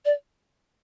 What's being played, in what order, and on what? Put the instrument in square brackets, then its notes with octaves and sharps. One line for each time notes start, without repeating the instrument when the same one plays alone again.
[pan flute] D5